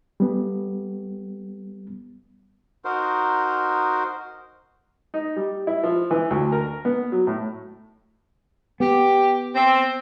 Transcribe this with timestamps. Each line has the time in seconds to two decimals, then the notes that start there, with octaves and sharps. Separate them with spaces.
0.20 G3 B3
2.85 D#4 F#4 A#4 C5
5.14 D#4
5.36 G3
5.67 E4
5.83 F3
6.11 E3
6.30 D2
6.52 A#4
6.85 B3
7.12 F#3
7.27 A2
8.80 B3 G4
9.55 C4